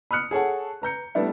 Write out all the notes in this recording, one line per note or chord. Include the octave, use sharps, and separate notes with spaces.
B5 D#6 F6 F#6 C#7
G#4 A4 C#5 F#5
B4 A#5 G6 C#7
G3 A3 B3 D4 E4